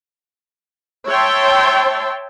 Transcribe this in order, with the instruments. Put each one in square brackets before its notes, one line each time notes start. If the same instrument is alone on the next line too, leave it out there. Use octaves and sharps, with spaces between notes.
[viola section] C#5 E5 G5 A5 C6